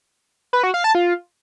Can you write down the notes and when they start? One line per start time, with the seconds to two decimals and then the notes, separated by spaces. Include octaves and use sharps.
0.53 B4
0.63 F#4
0.74 F5
0.84 A5
0.95 F4